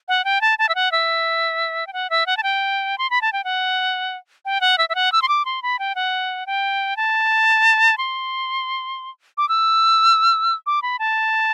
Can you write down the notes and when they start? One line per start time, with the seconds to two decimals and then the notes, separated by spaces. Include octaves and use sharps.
0.08 F#5
0.25 G5
0.41 A5
0.59 A5
0.69 E5
0.75 F#5
0.92 E5
1.87 G5
1.93 F#5
2.10 E5
2.26 F#5
2.37 A5
2.43 G5
2.98 C6
3.10 B5
3.21 A5
3.33 G5
3.44 F#5
4.45 G5
4.61 F#5
4.78 E5
4.89 E5
4.95 F#5
5.12 E6
5.22 C6
5.28 D6
5.45 C6
5.62 B5
5.79 G5
5.95 F#5
6.46 G5
6.97 A5
7.98 C6
9.38 D6
9.49 E6
10.66 D6
10.82 B5
10.99 A5